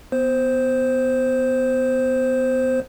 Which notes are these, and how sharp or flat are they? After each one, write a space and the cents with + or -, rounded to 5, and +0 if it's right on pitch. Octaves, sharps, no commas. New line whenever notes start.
B3 +15 C5 +0